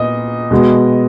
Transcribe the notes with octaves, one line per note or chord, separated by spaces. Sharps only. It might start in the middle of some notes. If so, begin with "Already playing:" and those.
Already playing: A#2 B3 D#5
B2 G#3 B3